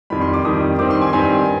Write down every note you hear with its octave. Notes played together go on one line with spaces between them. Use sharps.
F2 D#3 G3 B5
C6
D6
F2 D#3 G3 D#6
G2 D#3 G3 C4 D6
C6
G#5
G2 D#3 G3 C4 G#5